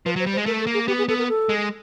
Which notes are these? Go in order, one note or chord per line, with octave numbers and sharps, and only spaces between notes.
F3 B4
F#3 C5
G3
C5
G#3
A3 A#4
A4
A#3
G#4
B3 G4
G#4
B3 A4
A#4
A4
G#3